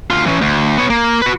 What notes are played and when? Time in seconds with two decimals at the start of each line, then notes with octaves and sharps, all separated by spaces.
0.10 D2 F4
0.26 E3 C#4
0.42 D2
0.78 B3 C#5
0.90 A#3
1.22 F#4 B4